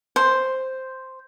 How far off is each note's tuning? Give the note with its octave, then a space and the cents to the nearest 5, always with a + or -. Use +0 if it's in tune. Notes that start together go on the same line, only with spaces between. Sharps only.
C5 +0